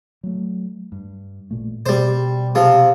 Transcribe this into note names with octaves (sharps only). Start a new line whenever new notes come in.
F#3 A3
G2
A1 A#2 A3
B2 G3 C5
C3 F3